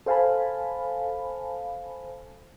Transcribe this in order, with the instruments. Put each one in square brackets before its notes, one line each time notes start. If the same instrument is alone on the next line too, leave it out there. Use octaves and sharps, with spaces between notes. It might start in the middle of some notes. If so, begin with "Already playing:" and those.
[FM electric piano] A4 C5 F5 G#5 A5 B5